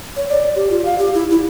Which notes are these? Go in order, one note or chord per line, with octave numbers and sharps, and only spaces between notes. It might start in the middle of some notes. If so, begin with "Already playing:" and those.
C#5
D5
G4
F4
F5
G4
E4
E4